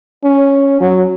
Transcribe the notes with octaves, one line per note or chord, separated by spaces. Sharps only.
C#4
F#3